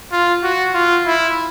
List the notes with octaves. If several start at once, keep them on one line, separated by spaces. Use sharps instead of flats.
F4
F#4
F4
E4